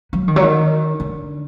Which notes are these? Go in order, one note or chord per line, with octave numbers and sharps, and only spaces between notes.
F#3
D#3
F#3
D#3
D3